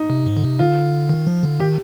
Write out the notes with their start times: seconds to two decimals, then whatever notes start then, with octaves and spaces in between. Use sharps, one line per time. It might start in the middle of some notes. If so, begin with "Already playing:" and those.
Already playing: D#4
0.10 C3
0.26 G#2
0.37 D3
0.43 C3
0.59 D3 F4
1.09 D#3
1.27 F3
1.43 D3
1.60 D#3 G4